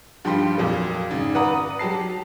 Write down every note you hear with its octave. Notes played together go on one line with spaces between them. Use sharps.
G2 F3 G3 G5 C6 B6
F2 A#2 F#3 A#3
G#1 C#3
B4 D5 F#5 A#5 D#6
F#3 G4 A5 C7